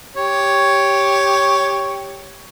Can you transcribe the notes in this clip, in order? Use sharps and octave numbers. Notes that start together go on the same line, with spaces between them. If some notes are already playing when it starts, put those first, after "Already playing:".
G4 C#5